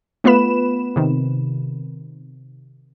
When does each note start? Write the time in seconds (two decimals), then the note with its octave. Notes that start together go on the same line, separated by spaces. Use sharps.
0.24 A3 B3 F4 B4 B5 E7
0.96 C3 D#3